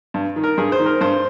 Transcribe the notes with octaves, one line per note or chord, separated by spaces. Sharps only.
G2
D#3
A#4
G2 G#4
C5
D#3
A#4
G2 C5